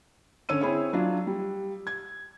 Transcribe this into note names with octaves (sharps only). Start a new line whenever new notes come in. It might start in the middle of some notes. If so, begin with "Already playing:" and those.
D3 C#4 C#5 E6 D#7
C4 E4 G#4 C#5
F#3 D4 F4
G3
G#6